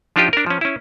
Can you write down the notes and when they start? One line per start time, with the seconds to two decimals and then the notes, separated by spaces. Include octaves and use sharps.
0.16 F3 D4 D#4 F4 G4 D#5
0.33 D4 A#4
0.46 F3 C#4
0.61 C#4 E4